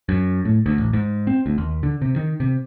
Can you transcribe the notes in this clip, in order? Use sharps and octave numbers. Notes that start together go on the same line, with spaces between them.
F#2
A2
D2
A1
G#2
C4
D2
D#2
D3
C3
D#3
C3